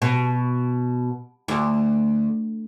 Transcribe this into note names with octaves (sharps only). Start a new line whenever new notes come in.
B2
D2